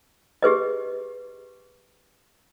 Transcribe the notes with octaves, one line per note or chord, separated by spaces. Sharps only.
G4 G#4 B4 D#5